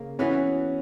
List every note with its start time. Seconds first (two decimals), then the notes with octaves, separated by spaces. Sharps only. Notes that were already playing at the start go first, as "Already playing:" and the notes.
Already playing: C#3 A#3
0.19 E3 B3 C#4 F#4 B4